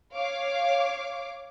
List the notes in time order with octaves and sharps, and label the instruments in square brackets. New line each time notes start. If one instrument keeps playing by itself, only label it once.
[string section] C#5 F5 D6